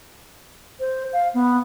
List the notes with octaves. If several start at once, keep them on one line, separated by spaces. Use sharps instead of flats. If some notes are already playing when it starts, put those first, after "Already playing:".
C5
F5
B3